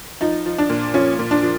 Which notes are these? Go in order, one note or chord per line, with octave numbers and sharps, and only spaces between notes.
F3 D#4
F3
D4
A#2
F3 C#4
A#2
D4
F3